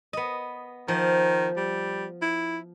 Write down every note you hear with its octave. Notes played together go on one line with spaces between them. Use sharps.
B3 D#5
D#3 F3
G3
E4